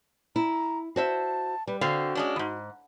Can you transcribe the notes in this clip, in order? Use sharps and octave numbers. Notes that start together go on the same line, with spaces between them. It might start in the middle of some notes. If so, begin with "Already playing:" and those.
E4 A#5
F#4 C5 E5 A5
G3 B4
D3 C4 F#4 F5
G#3 C#4 D4
E2 G#2